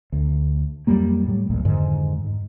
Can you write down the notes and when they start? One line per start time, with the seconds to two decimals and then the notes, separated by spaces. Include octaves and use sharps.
0.12 D2
0.87 F2 F#3 G3 A#3
1.26 A2 F#3 G3
1.50 A1 D2 A#2
1.65 F2 G#2 D3 D#3
2.26 G#2